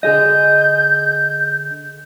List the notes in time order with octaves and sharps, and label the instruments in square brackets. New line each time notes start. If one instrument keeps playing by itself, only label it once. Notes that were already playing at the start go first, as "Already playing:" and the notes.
[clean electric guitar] D3 G#4 D#5 [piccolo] G6